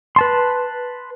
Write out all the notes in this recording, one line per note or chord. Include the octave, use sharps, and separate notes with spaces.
B4 A5 C6